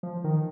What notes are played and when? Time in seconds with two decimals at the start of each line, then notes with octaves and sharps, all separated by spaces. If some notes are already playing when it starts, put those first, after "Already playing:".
0.03 F3
0.24 D#3